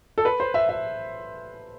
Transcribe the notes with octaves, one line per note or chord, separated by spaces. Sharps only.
A4
B4
C5
E5
E5